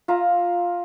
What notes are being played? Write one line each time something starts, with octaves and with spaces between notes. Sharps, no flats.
F4 E5 A#5